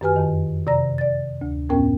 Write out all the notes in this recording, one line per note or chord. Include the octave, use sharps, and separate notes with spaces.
F#2 D#3 G4 B4 G#5 F6
F2 D#3
C3 D5 A#5 A#6
D5 A6
D2
F2 A2 B3 C#4 A#4 G5